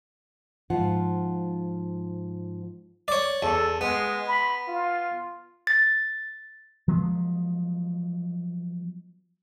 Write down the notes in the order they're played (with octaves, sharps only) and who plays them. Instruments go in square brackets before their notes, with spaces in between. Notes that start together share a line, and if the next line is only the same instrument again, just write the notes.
[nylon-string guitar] G#2 F3 F4 F#5
[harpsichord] C#5 D5
[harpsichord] E2 [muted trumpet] A4
[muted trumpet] G#3 [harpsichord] B3
[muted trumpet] B5
F4
[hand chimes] A6
[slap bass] F3 F#3 G#3 B3